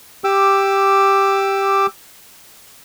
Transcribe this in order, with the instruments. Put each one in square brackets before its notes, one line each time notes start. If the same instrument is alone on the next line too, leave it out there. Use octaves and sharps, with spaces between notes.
[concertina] G4 D6 E6